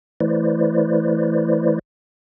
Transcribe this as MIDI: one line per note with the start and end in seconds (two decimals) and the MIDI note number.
0.20 1.79 52
0.20 1.79 57
0.20 1.79 64
0.20 1.79 71
0.20 1.79 72
0.20 1.79 74